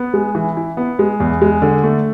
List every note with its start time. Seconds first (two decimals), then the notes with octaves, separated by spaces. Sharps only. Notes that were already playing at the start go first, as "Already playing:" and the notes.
Already playing: B3
0.14 G#3
0.35 E3
0.57 E4
0.77 B3
0.99 G#3
1.20 E2
1.42 G#3
1.62 D3
1.84 A3